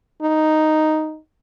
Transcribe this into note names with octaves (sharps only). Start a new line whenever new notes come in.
D#4